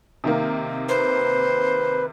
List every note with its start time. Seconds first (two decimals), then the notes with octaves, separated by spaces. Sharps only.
0.24 C3 D#3 A#3
0.89 B4 C5